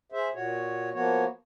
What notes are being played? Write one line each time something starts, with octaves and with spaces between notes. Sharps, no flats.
G#4 C5 E5
A#2 F#4 C#5
F3 A#3 B3 F#4 C#5